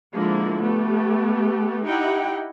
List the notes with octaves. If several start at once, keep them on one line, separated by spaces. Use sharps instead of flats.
D3 F3 G#3 A#3 E4
A3 B3 G4
D#4 E4 G4 F#5 G5